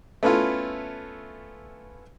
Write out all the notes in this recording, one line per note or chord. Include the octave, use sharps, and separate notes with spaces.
A3 B3 C#4 E4 F4